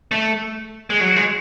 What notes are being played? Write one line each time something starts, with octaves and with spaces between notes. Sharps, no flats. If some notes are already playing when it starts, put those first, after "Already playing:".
A3
G#3
F#3
G#3